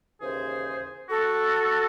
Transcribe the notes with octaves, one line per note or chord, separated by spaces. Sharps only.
D#2 C#3 E3 G#4 C5
F#4 A4